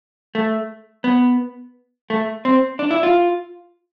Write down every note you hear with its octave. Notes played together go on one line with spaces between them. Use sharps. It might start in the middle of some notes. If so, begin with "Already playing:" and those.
A3
B3
A3
C4
D4
E4
F4